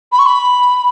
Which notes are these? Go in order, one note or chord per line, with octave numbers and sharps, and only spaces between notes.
B5
C#6
B5